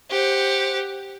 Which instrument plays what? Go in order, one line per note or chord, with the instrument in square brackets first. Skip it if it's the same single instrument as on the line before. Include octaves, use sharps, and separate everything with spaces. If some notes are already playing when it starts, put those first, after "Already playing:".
[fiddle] G4 F#5 [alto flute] C5